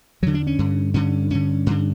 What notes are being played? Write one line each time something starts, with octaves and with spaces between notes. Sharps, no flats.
E2 D3 F#3
D4
C#4
G2 D3
G2 D3 C#4
G2 D3 C#4
G2 D3